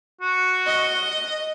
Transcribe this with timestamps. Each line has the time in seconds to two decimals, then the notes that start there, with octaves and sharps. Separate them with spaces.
0.21 F#4
0.66 D#5